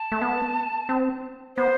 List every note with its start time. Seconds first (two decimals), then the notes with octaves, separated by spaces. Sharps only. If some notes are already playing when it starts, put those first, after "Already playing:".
Already playing: A5
0.12 A3
0.22 B3
0.89 C4
1.56 B3 C5